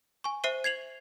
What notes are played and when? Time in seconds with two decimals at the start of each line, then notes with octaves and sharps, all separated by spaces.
0.24 G#5 C#6
0.44 C5 E5 C7 D#7 G7
0.64 G#6 C7 F7 F#7